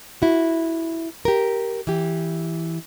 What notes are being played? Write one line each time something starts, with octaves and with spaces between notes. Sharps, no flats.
E4 F#4
G4 A#4
E3 G4